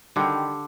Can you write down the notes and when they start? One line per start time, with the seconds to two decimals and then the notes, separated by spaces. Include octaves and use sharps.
0.16 D3 D#3 G3